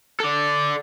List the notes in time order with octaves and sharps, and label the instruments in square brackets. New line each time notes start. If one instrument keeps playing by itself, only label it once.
[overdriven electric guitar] A4 D5